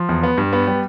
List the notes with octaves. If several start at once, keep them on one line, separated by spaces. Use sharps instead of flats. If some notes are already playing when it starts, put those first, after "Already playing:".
Already playing: F3
E2
B3
G2
B3
G3